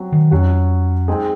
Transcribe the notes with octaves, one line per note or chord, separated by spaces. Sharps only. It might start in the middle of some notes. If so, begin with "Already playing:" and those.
Already playing: F#3 C4 F#4
D#3
F2 F#3 C#4 F#4
G#3 C4 D#4 G#4